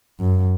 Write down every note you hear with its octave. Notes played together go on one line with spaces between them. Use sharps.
F#2